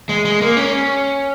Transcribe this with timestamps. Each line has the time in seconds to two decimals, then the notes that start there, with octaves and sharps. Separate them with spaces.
0.09 G#3
0.25 G#3
0.42 A#3
0.57 C#4